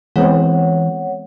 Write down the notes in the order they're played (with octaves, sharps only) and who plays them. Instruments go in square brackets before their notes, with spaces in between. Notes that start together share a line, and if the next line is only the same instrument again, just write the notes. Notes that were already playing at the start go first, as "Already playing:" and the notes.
[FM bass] E3 [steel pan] G#3 B3 C4 [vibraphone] C#5 F#5